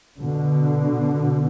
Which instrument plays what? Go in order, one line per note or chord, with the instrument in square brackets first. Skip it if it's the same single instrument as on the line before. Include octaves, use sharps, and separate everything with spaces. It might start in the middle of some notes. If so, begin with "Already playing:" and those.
[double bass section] B2 D3